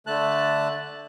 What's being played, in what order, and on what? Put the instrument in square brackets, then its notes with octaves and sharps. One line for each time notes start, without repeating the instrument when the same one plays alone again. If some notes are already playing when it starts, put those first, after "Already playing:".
[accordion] D3 A3 A5 F#6